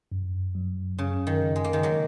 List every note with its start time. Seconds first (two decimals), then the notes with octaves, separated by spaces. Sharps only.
0.12 F#2
0.55 F#3
0.97 F#2 C#3
1.27 D#3
1.41 C#3
1.56 G#3
1.64 A#3
1.73 D#3 G#3
1.83 F#3 A#3